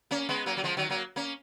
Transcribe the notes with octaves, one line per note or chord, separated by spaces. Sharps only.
A#3 C#4
G#3 B3
F#3 A#3
F#3
F3 G#3
D#3 F#3
F#3 A#3
A#3 C#4